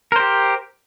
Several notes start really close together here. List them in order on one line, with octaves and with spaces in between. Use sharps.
A#4 C5 G4